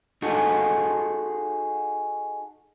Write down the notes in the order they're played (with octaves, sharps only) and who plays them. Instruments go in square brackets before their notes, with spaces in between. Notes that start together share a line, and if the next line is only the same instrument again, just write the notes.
[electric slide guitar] D#4 F#4 G#4 A4